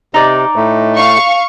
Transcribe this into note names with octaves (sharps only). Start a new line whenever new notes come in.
C3 D#4 D5
A2 A3
F5 C#6